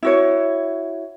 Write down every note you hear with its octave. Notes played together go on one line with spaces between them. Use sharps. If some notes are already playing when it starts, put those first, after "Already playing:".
E4 F#4 C#5